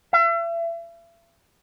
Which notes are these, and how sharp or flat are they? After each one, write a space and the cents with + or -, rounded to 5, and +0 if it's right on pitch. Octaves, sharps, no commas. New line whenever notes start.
E5 +40